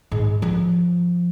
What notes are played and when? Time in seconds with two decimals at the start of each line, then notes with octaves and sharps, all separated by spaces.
0.11 G#2
0.42 F3